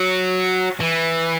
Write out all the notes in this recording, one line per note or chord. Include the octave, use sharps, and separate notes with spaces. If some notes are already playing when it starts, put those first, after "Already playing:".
Already playing: F#3
E3